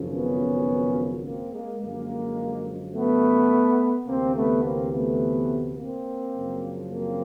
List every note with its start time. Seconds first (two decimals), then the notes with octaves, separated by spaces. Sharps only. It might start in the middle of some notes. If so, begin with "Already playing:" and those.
Already playing: G#1 F#2 C#3 F3
0.11 B3 C#4
1.24 A#3 C4
1.52 G#3 A#3
1.81 F#2 D3 F3 G#3 A#3
2.93 A3 B3
4.07 D2 C3 E3 A#3 C4
4.35 A3 B3
4.63 A#3 C4
4.92 A3 B3
5.76 A#3 C4
6.33 F#2 C#3 F3
6.90 A#3 C4